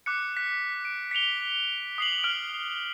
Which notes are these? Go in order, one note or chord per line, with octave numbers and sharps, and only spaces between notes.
D6 F#6 C#7
F#6 B6
D7
B6 C#7 D7 F7 G7
D#6 C7 F#7
F6 D7